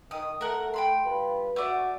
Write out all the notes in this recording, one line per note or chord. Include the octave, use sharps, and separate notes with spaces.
D#3 D#6
A3 A#4 F#5
G5 B5 C6
G2 F4 B4
A3 F#4 D5